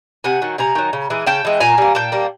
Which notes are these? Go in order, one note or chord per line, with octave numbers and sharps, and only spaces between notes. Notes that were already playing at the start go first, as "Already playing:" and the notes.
C3 F#5 G#5
D#3 F#3
C3 G#5 A#5
D#3 F#3
C#3
E3 G#3
C#3 G5 A5
E3 G#3
A#2 G#5 A#5
G3 A#3
A#2 G5 A5
G3 A#3